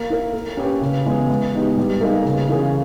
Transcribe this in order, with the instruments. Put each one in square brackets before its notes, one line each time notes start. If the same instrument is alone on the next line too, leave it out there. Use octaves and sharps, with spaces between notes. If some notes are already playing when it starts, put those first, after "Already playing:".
Already playing: [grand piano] A#3
E4 A#4
A#3
C#4 G4 B4
C#3
E3 G#3 B3
G#3
B3 D#4 G4
G3
A#3 D#4 G#4 B4
C#3
E3 A#3 C#4 G#4